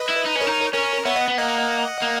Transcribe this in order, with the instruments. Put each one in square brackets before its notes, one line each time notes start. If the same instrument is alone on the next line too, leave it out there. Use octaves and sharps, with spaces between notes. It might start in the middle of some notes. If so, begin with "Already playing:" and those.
Already playing: [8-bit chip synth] B4 D#5
[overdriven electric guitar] E4
D#4
C#4
[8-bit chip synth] A#4 C#5
[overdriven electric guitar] D#4
[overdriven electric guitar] C#4 [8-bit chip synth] A#4 C#5
[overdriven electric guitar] B3 [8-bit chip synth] C#5 E5
[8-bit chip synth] D#5 F#5
[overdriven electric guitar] B3
[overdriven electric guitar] A#3 [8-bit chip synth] D#5 F#5
[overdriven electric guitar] A#3